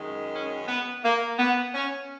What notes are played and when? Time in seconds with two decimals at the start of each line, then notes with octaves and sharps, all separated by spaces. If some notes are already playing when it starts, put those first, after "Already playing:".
Already playing: F#2 D#3 G#3
0.33 C#4
0.68 B3
1.04 A#3
1.38 B3
1.74 C#4